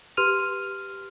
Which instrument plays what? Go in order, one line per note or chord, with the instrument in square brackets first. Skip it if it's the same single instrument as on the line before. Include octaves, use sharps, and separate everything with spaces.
[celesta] G4 B4 C6 F6 D#7 F7